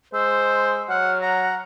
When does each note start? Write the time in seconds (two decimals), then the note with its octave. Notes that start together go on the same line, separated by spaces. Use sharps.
0.14 G#3 C5 E6
0.89 F#3 F#5 F6
1.22 F#5 A#5